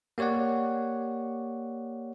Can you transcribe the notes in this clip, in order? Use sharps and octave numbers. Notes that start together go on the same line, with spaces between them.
A#3 G4 C#5 D5 F#5